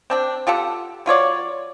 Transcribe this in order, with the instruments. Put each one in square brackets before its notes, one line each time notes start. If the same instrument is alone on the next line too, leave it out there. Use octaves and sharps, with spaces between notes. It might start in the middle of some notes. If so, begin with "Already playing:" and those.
[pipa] C4 D4 G5
F4 G4 A4 F#5
F#3 F4 C#5 D5